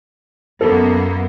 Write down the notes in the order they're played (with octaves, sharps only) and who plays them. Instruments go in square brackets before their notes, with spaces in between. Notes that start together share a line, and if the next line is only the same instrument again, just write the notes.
[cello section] F#2 A#3 B3 [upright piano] A4